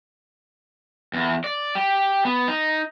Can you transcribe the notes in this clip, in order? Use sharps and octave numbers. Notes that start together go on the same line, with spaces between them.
E2
D5
G4
B3
D#4